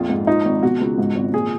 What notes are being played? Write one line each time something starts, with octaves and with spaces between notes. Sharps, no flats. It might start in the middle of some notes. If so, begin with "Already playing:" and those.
Already playing: A#1 F2 F4
G#2
F3 D#4
G#1
B2 F#4
C#2
G#2
G#1
A#2 G#4